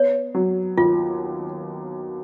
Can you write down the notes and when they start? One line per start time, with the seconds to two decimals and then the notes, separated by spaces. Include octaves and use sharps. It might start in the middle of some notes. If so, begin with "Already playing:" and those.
Already playing: B3 C#5
0.34 F#3
0.77 D#2 F4